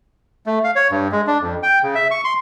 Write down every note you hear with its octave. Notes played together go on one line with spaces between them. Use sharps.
A3
F5
C#5
G2
G#3
D4
F2
G5
C#3
E5
C#6
C6